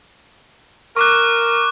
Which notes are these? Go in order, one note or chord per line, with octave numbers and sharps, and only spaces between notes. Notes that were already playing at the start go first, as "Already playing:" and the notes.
A#4 C#6 D6 F#6